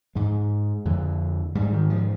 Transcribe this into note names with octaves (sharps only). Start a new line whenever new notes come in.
G#2 G#3
F2 D3
G#2 G3
D#3
F3